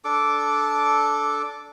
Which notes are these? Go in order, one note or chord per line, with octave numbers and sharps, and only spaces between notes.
D4 A4 D6